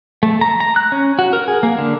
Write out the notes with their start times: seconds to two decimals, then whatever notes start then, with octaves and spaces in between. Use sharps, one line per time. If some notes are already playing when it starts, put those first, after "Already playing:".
0.23 A3
0.41 A#5
0.60 A#5
0.76 F#6
0.92 C#4
1.19 F#4
1.33 A#4
1.48 G#4
1.63 A#3
1.78 D3